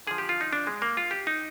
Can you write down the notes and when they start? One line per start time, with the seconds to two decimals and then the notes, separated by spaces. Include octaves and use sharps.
0.07 D3 F3 G#4
0.18 G4
0.29 F4
0.41 D#4
0.53 D4
0.67 G#3
0.82 A#3
0.97 F4
1.11 G4
1.27 D#4